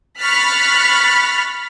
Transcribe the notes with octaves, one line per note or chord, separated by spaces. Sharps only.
B5 C#6 F6 F#6 A6 B6